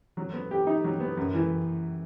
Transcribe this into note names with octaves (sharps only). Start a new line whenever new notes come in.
F#3
B3
G4
D#4
F#3
B3
F#2
E3